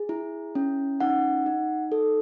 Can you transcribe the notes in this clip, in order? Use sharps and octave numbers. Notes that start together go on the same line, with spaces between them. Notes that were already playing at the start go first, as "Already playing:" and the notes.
Already playing: G#4
E4
C#4
D#4 F#5
D#4
A4